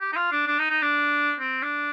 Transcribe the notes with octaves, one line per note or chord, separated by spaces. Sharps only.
G4
D#4
F4
D4
D4
D#4
D#4
D4
C4
D4